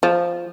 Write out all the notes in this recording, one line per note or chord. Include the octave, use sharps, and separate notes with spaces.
F3